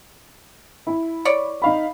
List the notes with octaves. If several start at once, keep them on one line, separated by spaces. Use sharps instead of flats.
E4
C#5 D5
D#4 F5 B5